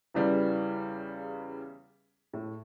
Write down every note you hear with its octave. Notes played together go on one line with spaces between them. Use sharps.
E2 C#3 E3 G3
A2